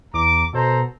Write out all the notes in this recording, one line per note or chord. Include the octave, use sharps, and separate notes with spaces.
E2 A#5 D6
B2 A4 C5 A#5